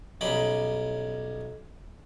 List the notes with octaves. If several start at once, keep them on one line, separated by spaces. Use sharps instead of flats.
B1 G3 C#4 D#4 G5 B5